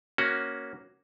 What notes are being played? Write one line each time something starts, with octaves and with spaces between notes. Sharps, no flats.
A#3 C#4 F#4